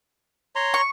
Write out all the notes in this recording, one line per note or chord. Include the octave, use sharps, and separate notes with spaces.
C#5 A#5 C6
C#6